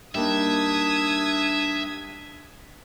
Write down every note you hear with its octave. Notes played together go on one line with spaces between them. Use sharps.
G3 A#3 D4 D#4 E5 D#6 G#6